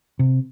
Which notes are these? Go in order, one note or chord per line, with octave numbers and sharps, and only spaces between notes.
C3